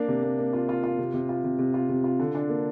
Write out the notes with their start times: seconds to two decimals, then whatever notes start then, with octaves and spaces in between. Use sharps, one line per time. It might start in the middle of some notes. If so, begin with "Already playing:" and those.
Already playing: A#3 D4
0.08 C3
0.23 A#3
0.39 A#3
0.53 F4
0.69 F4
0.84 F4
0.99 C3
1.14 C3
1.29 F4
1.44 C3
1.59 C3
1.74 F4
1.89 C3
2.04 F4
2.19 D3
2.35 D4
2.49 A#3